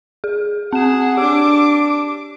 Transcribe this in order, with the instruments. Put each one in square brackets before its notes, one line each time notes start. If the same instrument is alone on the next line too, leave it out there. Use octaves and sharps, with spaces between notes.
[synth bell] G#4
[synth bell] C4 E7 [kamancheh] G#4 F#5
[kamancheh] D4 D6 [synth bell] G4